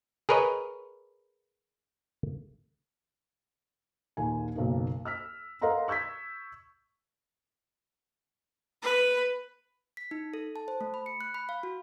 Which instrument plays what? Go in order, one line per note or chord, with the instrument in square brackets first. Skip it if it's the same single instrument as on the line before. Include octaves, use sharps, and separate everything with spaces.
[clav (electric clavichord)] G#4 A#4 B4 C#5 D#5
[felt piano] A#1 D#2 D#3 G#5
F#1 B1 A#3 D#4
E6 F6 B6
A#4 D#5 F5 F#5 A#5 C6
C#6 E6 G6 G#6 B6
[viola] B4
[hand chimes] B6
D#4
A4
A5
C5
A3
B5
C#7
F#6
B5
F5
F#4